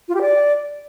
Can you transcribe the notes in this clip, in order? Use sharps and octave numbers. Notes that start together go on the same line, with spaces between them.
F4
G4
D5